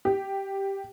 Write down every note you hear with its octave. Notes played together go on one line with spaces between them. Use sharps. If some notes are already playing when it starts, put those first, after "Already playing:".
G4